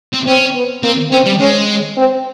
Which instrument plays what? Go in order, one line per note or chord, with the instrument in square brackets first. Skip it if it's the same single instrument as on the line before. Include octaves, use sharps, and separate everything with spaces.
[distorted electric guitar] C4
[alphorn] C4 [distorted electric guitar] C#4
[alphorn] B3
[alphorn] A#3 [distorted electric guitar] C4
[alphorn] C4 [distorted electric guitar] C#4
[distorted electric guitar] G3
[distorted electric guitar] G#3 [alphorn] C#4
[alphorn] C4